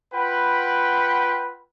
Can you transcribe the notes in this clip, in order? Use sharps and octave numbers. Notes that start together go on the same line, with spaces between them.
F4 B4 F#5 G5 B5